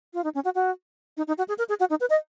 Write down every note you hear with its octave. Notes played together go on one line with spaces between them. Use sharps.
F4
D#4
C#4
F#4
F#4
D#4
D#4
F#4
G#4
A#4
G#4
F#4
D#4
B4
D#5